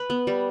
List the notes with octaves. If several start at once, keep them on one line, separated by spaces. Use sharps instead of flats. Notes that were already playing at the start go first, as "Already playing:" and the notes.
Already playing: B4
B3
G3